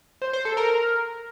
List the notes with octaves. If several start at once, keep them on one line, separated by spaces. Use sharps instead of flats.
C5
C5
A4
A#4